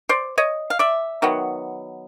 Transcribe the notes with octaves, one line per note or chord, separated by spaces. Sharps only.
C5 D5
C#5 D#5
F5
D5 E5
D#3 F#3 B3